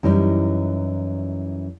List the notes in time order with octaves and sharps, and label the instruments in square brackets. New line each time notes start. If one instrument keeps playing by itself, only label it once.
[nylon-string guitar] F#2 E3 G3 D#4